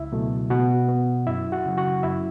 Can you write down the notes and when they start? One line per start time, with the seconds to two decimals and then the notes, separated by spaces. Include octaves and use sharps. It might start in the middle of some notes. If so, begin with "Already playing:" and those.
Already playing: C#2 E4 E5
0.12 B2 F#3 A3
0.50 B2 F#4 F#5
0.88 B3
1.27 F#2 E4 E5
1.52 F#4 F#5
1.65 C#3 F#3
1.78 F#4 F#5
2.03 F#2 E4 E5